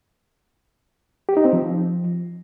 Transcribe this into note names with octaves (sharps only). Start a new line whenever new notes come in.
G4
D#4
C4
F3